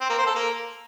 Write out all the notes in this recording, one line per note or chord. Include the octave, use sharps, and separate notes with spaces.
C4
A#3
C5
A4
A#3